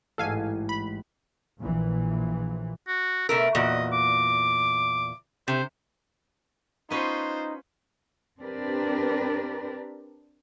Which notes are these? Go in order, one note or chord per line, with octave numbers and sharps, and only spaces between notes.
A1 G#2 A4 F5 G#5
B5
A#1 A#2 E3
F#4
B2 A3 A#4 E5
E2 A#2 F#4 D#5
D6
C3 C5
B3 C#4 D#4 F4 B4 C5
C4 D4 G4 A#4 B4 D5